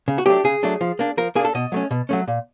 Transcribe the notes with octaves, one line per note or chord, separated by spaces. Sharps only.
C#3
F#4
F#3 A3 D4 G4
C#3 G#4
F#3 A3 D4
F3
A#3 D4
F3 A#4
A#3 D4 G#4
A4
B2 D#5
F#3 A3 C#4
B2
F#3 A3 C#4
A#2